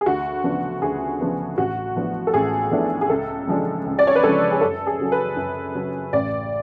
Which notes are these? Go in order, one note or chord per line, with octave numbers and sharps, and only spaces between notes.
G#4
D2 F#4
C#3 F3 B3 D4
D2 G#4
C#3 F3 B3 D4
A1 F#4
A2 F3 B3 D4
A4
A1 G#4
A2 F3 B3 D4
G#4
C#2 A4
C#3 F3 G#3 D4
C#2
D5
C#5
B4
C#3 F3 G#3 D4 A4
G#4
F#2 A4
G#4
C#3 F#3 C#4
B4
F#2
C#3 F#3 C#4
A1 D5